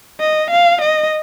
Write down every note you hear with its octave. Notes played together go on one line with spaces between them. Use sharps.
D#5
F5
D#5